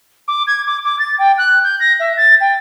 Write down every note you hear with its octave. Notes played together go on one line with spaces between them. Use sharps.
D6
G#6
D6
D6
A6
G5
F#6
G6
A#6
E5
A6
G5